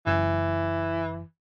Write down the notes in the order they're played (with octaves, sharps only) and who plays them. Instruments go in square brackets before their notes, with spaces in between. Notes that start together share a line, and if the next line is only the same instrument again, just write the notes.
[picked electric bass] F#1 [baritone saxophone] E3